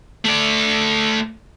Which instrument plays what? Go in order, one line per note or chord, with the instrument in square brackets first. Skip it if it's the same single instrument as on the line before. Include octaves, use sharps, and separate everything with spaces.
[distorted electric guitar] A3 D5